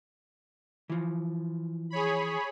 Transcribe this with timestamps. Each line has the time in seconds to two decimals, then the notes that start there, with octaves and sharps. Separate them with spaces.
0.90 E3 F3
1.90 G#4 C#5 B5